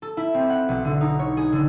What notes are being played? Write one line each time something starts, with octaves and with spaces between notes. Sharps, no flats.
A4
E4
C4
F#5
B1
D3
D#4
C#5
G#4
D3